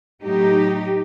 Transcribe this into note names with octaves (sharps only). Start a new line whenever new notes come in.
A2 F#3 D#4 G4